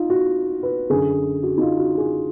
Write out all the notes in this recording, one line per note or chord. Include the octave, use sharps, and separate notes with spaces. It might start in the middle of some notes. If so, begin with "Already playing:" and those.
Already playing: D#4 F4
F#4
B4
F#2 D3 G#4
F#4
D#4
F4
F#4
G#4